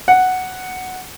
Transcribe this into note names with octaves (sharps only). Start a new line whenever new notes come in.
F#5